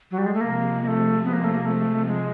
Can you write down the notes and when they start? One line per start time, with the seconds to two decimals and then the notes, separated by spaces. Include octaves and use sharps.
0.11 F#3
0.18 G3
0.26 G#3
0.34 A3
0.41 C3 F3 G#3 A#3
0.82 A#3
0.87 A3
1.24 B3
1.33 A#3
1.44 A3
1.54 A#3
1.65 A3
2.07 G#3